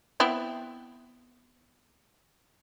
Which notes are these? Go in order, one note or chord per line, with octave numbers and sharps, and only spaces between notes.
B3 C4 E4